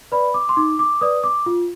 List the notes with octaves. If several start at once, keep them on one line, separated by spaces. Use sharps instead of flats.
B4 D5 B5
D6
C6
D#4 D6
D6
B4 D5 D#6
D6
F4